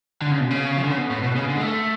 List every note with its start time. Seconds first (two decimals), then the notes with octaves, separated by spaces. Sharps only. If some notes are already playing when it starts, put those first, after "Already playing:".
0.22 D3
0.31 C#3
0.40 B2
0.50 C#3
0.77 F3
0.84 D3
0.91 C#3
0.98 B2
1.11 A2
1.23 B2
1.36 C#3
1.49 D3
1.56 G#3
1.61 A3